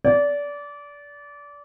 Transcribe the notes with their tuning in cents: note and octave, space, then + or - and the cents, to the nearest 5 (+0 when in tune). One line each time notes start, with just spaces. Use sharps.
D5 -25